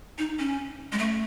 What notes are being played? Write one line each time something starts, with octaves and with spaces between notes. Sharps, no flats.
D#4
C#4
G#3
A3